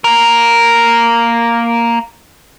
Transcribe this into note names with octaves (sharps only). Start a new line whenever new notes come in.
A#3 A#4